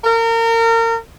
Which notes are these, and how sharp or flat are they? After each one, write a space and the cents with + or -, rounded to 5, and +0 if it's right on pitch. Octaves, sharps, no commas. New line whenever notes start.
A#4 -30